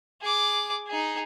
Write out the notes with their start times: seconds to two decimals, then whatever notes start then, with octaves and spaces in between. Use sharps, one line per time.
0.22 G#4 D6
0.88 D#4 G#4